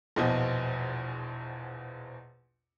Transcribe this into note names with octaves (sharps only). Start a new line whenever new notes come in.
A#1 E2 B2 F3 D#5